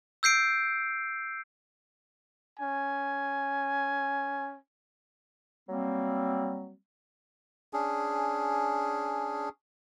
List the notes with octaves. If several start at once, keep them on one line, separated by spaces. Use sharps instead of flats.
E6 G6 C7 D7
C#4 G#5
F#3 G3 A#3 C4
C#4 D4 G#4